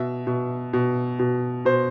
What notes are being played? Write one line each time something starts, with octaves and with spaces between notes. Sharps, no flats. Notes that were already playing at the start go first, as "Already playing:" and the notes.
Already playing: B2 E5
B2
B2
B2
B2 C5